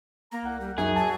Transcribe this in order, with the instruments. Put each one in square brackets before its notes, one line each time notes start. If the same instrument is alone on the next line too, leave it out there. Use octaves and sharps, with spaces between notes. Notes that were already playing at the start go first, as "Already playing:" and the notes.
[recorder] A#3 [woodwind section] A#5
[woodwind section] C2 F#5
[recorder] G3
[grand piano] F#2 [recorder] D#4 [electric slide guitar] G#4
[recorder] F#3 [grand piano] A5